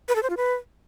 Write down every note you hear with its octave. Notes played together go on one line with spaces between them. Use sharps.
B4
A4
C5
F4
B4